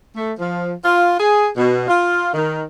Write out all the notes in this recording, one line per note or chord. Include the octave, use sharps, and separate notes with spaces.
A3
F3
F4
G#4
B2
F4
D#3